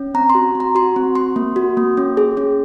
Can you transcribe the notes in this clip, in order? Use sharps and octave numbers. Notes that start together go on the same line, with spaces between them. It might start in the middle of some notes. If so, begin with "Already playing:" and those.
Already playing: C#4
C4 A#5
C6
F#4
C4
A#5
F#4 C6
C4
C4 C6
A#3
F#4
A#3
C#4
G#4
C#4